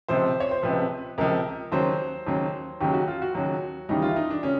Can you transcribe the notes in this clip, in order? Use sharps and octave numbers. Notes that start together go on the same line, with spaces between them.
C#2 C3 F3 C5
C#5
C5
C#2 C3 F3 B4
C#2 C3 F3 A#4
D#2 C#3 F#3 C5
D#2 C#3 F#3
D#2 C#3 F#3 G4
F#4
F4
F#4
D#2 C#3 F#3
D#2 C#3 E3 G3 D#4
F4
E4
D#4
D4
C#3 C#4